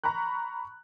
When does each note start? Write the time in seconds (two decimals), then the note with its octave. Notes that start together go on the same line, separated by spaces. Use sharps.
0.04 A#5 B5 C#6 F#6